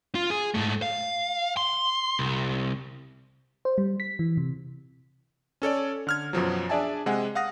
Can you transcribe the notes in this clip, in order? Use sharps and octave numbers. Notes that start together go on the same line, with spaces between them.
F4
G#4
G#2 A3
F5
C6
C2
C5
G3
B6
E3
C3
C#4 A4 C#5 D5
D3 F6 G#6
F#2 B2 F3 F#3
D4 G#4 D5 E5 G#5 A5
C3 G#3 F#5 G#5
F5 F#5 D#6 A#6